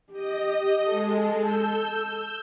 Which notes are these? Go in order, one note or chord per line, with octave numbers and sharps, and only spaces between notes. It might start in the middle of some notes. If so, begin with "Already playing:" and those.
G4 D#5
G#3 A4
E6 G6